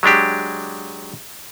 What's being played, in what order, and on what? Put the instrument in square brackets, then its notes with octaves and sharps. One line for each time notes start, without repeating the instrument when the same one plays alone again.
[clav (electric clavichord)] F#3 G#3 D4 G4